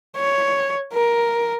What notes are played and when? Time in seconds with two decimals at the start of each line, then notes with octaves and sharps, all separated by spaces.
0.17 C#5
0.94 A#4